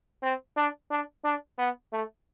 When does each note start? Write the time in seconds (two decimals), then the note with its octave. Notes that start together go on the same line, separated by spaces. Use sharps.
0.23 C4
0.57 D4
0.91 D4
1.24 D4
1.58 B3
1.92 A3